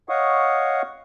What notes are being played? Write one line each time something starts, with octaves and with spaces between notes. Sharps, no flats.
C#5 D#5 F5 F#5 C#6 D#6